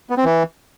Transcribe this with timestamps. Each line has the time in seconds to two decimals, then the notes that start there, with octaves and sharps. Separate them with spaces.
0.10 B3
0.17 C4
0.25 E3